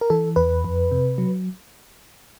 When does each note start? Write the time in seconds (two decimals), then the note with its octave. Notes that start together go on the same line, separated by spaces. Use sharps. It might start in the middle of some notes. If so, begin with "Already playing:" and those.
0.01 A#4
0.10 E3 A4
0.36 E2 B4
0.64 F2
0.91 C3
1.18 F#3